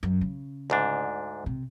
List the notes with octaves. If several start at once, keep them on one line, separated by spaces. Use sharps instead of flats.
F#2
C#3
D2 G#2 D4
C3